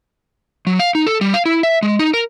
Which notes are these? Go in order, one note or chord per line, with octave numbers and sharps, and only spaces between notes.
F#3
F5
D#4
A4
G3
F5
E4
E5
G#3
D#4
A#4